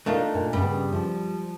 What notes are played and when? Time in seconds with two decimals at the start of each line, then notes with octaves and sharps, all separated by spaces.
0.06 A3 D4 D#4 F4 A#4 F5
0.34 A#2
0.53 G2 C#3 G3 B3
0.92 F3